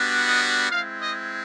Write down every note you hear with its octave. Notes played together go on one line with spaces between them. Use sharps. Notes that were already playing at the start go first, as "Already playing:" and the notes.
Already playing: G3 B3 D4 F#4
D#5
G#3 C4 E4 F5
D#5